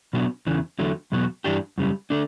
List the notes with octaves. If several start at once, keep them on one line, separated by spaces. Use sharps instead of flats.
B2 F#3 B3 D4 F#4
E2 C#3 E3
E2 D3 F#3 A3
E2 B2 F#3 B3 F#4
G2 E3 G3 D4 G4
F#2 C#3 G3
D3 A3 D4